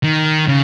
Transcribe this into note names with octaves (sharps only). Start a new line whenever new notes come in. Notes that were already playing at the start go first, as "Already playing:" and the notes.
D#3
C#3